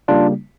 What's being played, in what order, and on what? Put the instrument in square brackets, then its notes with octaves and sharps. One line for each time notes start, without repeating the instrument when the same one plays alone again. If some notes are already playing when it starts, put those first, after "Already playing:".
[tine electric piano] C#3 G3 A#3 D4 F4